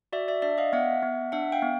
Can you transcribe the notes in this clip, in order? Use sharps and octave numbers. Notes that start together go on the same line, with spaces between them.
F#4 D5 E5
D5 E5
D4 D5 E5
D#5 F5
B3 E5 F#5
B3
D4 E5 F#5
F5 G5
B3